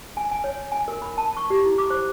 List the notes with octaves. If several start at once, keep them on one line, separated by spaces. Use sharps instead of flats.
G#5
G#5
C#5
G#5
A#4
B5
A5
C#6
G4
E4
D6
C5